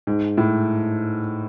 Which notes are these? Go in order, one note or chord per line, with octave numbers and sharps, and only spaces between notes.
G#2
A2